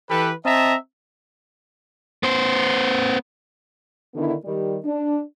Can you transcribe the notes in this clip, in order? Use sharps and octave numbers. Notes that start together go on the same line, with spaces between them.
E3 G4 A4 B4
C4 D#5 E5 A5 A#5
B3 C5
D3 D#3 B3 D4 E4
D#3 G3
D4